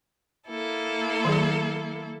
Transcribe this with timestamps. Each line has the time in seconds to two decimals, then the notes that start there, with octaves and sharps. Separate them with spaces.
0.47 A#3 E4 A4
1.25 D#3 F#3 G#4